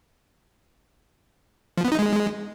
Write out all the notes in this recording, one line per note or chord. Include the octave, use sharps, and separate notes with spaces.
F3
B3
D#4
G#3